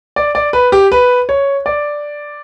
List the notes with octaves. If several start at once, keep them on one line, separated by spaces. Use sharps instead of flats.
D5
D5
B4
G4
B4
C#5
D5